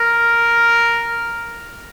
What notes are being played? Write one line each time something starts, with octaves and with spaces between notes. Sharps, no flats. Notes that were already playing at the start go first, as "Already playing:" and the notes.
Already playing: A#4